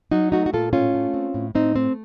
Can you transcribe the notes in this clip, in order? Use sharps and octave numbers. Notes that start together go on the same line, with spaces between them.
F#3 D#4 F#4
A3 D#4 F#4
F#4
A#2 F4 A4
A2 C#4 F4
A3
C4
A2
A2 C4 D#4
A3 C4